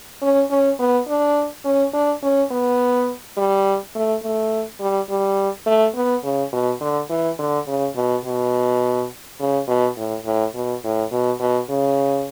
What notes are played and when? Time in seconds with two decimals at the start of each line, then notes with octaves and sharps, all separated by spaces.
0.22 C#4
0.51 C#4
0.79 B3
1.08 D4
1.65 C#4
1.94 D4
2.23 C#4
2.51 B3
3.37 G3
3.95 A3
4.23 A3
4.80 G3
5.09 G3
5.66 A3
5.95 B3
6.24 C#3
6.52 B2
6.81 D3
7.10 E3
7.39 D3
7.67 C#3
7.96 B2
8.24 B2
9.40 C#3
9.68 B2
9.97 A2
10.25 A2
10.54 B2
10.83 A2
11.12 B2
11.40 B2
11.69 C#3